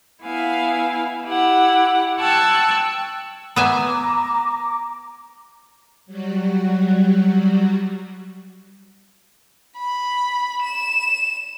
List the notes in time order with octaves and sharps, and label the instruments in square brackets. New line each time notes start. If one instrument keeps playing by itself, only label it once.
[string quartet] B3 E4 F5 G#5
E4 G4 F#5
G5 A5 C#6 E6 F#6 G#6
[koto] B3 E5 G#5 [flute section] A#5 D6
[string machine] F#3 G3 F#4
[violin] B5
E7